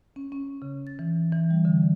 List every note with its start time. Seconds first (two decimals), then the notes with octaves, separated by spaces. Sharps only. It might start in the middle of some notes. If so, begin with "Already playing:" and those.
0.16 C#4
0.32 C#4
0.62 C#3
0.87 A6
0.99 E3
1.32 E3
1.51 G3
1.65 D3